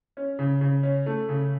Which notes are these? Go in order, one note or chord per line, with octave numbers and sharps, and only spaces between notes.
C#4
C#3
C#3
C#4
A3
C#3